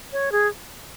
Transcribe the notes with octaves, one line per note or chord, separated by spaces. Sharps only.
C#5
G#4